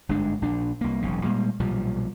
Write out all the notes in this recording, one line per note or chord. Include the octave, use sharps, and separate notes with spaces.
G1 G#2 G#3 D4
A#1 D4
C2 A#3
E1 B1 C#3
A#2 G3 G#3
B1 A#2 F3 G3